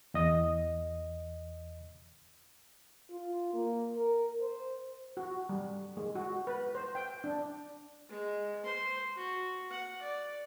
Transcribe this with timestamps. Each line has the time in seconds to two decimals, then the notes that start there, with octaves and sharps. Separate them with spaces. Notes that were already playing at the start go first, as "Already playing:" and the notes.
0.14 E2 D#5 D#6
3.11 F4
3.54 A#3
3.97 A#4
4.41 C5
5.17 F#4
5.49 G3
5.97 G#3
6.15 F#4
6.47 B4
6.75 C5
6.95 G5
7.24 D4
8.09 G#3
8.64 C5 C6
9.16 F#4
9.71 F#5
10.02 D5